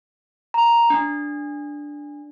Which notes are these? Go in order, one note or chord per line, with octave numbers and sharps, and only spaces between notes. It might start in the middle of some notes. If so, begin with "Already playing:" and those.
A#5
D4